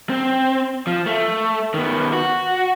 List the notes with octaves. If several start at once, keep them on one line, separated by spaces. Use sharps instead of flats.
C4
F3
A3
D#3 B3
F#4